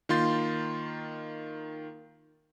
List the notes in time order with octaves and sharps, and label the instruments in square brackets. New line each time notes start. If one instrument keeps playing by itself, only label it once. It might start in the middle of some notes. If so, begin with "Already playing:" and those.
[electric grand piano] D#3 A#3 F4 C6 G6 A6